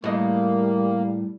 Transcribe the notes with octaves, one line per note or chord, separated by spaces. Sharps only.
A2 G3 A#3 D#5